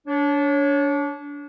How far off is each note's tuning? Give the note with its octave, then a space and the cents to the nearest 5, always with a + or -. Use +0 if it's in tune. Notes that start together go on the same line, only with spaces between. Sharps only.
D4 -25 C#5 +0